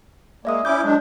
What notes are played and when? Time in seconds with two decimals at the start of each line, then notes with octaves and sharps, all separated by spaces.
0.45 G#3 A#3 D5 E5 D#6
0.65 C#4 E4 D6 G6
0.84 F#3 G#3 D4